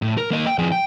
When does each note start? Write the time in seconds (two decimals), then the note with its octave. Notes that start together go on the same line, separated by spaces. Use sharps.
0.02 A2
0.17 A#4
0.31 A#3 D#5
0.47 G5
0.58 F2 G#4
0.72 G5